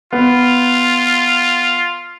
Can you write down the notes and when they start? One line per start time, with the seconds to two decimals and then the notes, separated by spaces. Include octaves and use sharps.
0.13 B3 F4